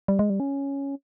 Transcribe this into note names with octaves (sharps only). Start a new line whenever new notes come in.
G3
G#3
G3
C#4